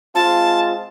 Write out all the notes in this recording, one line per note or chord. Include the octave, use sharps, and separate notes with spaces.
G#3 C4 F4 A5